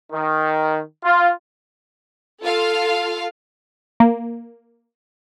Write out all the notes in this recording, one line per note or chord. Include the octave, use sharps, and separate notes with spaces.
D#3
F4
F4 A4 F5
A#3